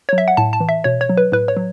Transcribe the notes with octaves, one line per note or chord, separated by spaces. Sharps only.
F#3 C#5
E5
F#5
A2 A5
A5
E3
E5
B2 C#5
C#5
F#3
B4
A2 B4
C#5
F#3